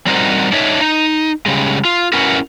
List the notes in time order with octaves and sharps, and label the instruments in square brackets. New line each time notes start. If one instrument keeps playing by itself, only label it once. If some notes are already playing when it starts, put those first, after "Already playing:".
[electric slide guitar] G3 C4 D#4 F#4 A#4 C5
D4 D#4 C#5 E5
D#4
C#3 G3 G#3
F4
C#4 E4 F#4 A#4 B4